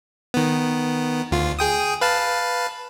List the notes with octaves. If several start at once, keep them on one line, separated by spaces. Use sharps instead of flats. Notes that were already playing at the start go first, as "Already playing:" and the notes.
D#3 B3
D2 F4
G#4 G5 D#6
B4 F5 A5